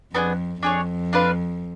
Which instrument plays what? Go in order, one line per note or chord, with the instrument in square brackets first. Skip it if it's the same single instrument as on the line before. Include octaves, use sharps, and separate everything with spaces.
[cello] F2 [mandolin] B3 D4 F4 G#4
[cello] F2 [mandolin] D4 G#4 C#5
[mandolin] D4 F4 B4 F5